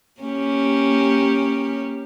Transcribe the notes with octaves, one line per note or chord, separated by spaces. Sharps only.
A#3 C#4 G4